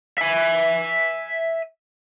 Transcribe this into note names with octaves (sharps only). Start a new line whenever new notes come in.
E5 G#5